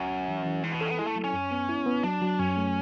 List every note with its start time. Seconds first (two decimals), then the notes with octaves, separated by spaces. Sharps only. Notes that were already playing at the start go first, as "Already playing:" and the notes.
Already playing: C#2 F#2
0.10 C#2
0.28 E3
0.46 E3
0.64 G#2 E3
0.72 B2
0.80 C#3 A4
0.90 B3
0.98 G#3 E4
1.07 A3
1.16 F#3
1.24 C#4
1.33 F#2
1.51 B3
1.69 E4
1.86 B3
2.04 F#3 D4
2.22 F#3
2.39 F#2 C#4
2.57 A3